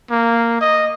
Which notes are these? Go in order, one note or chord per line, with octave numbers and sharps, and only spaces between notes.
A#3
D#5